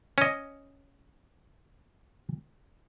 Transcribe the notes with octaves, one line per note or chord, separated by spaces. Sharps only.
C#4 D#5